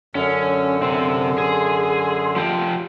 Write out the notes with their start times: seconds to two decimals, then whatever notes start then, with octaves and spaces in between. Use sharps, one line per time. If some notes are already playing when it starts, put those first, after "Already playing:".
0.15 F#2 D3 C#4
0.82 C3 C4 C6
1.38 G#4
2.36 F3 G4